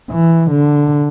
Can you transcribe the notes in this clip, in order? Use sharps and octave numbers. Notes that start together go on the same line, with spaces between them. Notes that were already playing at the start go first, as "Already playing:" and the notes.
E3
D3